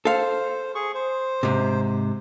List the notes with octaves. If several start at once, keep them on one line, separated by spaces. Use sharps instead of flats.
A4 C5 F5
G#4 C#6
C5
G#2 C3